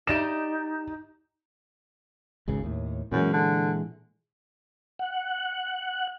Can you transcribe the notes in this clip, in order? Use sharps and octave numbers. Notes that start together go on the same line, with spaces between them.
D#4 G4 D5 D#5 E7
G#1 C#2 C#3
D#2 A2
F#2 A#2 E3 G#3
D3
F#5